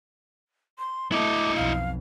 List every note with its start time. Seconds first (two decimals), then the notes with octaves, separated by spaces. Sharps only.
0.79 C6
1.12 A3 E4 D#5 D6
1.56 B1 F2 F5